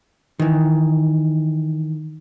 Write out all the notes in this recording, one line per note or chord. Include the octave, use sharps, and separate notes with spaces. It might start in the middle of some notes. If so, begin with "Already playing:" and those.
D#3 E3